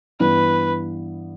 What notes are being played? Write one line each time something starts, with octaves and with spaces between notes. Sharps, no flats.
G2 E3 B3 B4